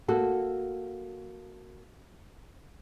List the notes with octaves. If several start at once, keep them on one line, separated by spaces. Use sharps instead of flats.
A#3 F#4 A4